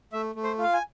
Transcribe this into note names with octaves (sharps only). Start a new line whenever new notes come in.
A3 E5
A3
C5
F4 F5
G#5